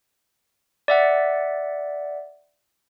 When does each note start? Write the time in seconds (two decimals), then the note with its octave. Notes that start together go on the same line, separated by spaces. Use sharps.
0.88 D5 E5 F#5